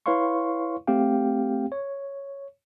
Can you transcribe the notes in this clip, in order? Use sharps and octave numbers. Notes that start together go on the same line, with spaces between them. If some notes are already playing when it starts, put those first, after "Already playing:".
E4 B4 C#5 F5 C6 C#6
A3 C4 G4 F5 G5
C#5